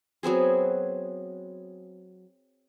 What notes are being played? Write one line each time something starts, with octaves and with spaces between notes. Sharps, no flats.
F#3 B3 C4 G#4